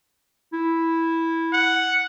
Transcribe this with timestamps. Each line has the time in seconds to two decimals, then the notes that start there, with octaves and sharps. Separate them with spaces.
0.53 E4
1.53 F#5